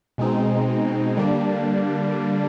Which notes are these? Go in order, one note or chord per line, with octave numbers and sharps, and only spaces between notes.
B2 G#3 C4 D#4
D3 G3 A#3 D4